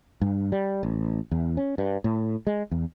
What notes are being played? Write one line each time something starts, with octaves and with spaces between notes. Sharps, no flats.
G2
G3
A1
E2
C#4
G2
A2
G#3
E2